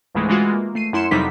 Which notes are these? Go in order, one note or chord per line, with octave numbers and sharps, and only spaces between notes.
C#2 G#2 E3 G#3 A3
E3 G#3 F4 F#4
A#3
A3 C7 D#7
F#2 E4 C6 C#7 E7
F2 C3 F#3 G3 D#4 B6